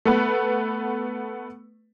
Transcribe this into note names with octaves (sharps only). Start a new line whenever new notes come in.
A3 B3 B4